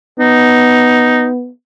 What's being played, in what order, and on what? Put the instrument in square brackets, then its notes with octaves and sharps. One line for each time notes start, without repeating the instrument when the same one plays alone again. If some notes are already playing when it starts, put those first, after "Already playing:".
[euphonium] B3 [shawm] D#4